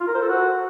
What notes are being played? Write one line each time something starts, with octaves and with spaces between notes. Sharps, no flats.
F4
A#4
C5
A4
F#4